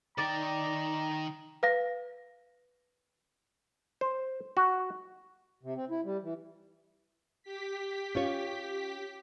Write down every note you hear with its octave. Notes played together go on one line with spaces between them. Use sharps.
D#3 D5 G5 A#5
B4 F5 A#6
C5
F#4
C3
C4
E4
G3
E3
G4 B6
C#4 F4 C#5